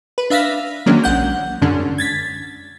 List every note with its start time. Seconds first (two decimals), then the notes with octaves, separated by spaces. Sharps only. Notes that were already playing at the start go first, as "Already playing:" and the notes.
0.18 B4
0.30 D4 E5 F5 A#6 B6
0.86 D#3 F#3 G#3 A#3 C#4 D4
1.04 A#1 F#5 G6
1.61 F#2 D3 G#3 C#4 D4
1.98 G#6 A6 B6